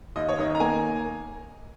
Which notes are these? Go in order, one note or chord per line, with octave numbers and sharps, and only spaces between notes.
D#2 D#5
C#5
D#3 D#5
A#5
A#3 G#5